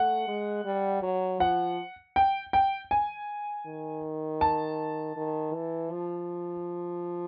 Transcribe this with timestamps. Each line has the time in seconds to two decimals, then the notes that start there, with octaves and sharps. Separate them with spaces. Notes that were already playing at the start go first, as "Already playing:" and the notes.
Already playing: A3 F#5
0.28 G#3
0.65 G3
1.03 F#3
1.40 F3 F#5
2.16 G5
2.53 G5
2.91 G#5
3.66 D#3
4.41 A5
5.16 D#3
5.54 E3
5.92 F3